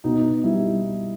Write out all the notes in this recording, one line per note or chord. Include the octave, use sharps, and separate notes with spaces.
B2 D#4
G3 E4